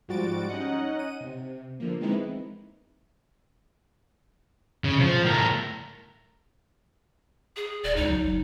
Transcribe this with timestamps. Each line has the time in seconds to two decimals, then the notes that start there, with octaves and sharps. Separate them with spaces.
0.08 G#2 F3 G3 F#4 A6 D7
0.49 C#4 D#4 D#5 F#5
0.99 D#7
1.21 C3
1.80 D3 F3 A#3
2.00 E3 G#3 B3 C4 D#4 E4
4.84 C#3
5.00 F3
5.23 A2 A#4
7.56 G#4
7.84 D#1 D5
7.96 C#2 D#4
8.09 F#3
8.23 F#1